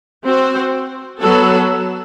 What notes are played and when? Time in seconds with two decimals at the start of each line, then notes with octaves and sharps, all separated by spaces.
0.24 C4 F#4 C5
1.21 F#3 B3 F#4 A4